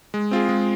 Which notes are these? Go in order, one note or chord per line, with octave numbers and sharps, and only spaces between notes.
G#3
C4 F4 G#4
G#3